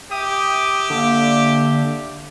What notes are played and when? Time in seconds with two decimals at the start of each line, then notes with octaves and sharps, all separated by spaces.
0.11 G4 E5 G5 D6 D#6
0.90 D3 A#3